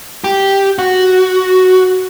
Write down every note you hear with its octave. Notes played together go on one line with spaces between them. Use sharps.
G4
F#4